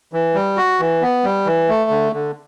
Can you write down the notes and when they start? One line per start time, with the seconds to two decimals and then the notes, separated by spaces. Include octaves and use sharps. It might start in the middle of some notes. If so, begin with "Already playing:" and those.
0.13 E3
0.35 G3
0.57 F#4
0.80 E3
1.02 B3
1.24 G3
1.46 E3
1.69 A3
1.90 D3
2.13 D3